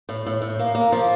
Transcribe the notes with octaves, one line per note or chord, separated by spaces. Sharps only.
A2
A2
A2
A#3
A#3
F3